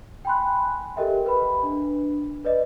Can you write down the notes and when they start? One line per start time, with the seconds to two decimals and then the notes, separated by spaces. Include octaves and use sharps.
0.25 G5 G#5 B5 C6 F#6
0.96 G4 A4 A#4 D#5 E5 G5
1.26 B4 B5
1.63 D4
2.45 B4 D5 D#5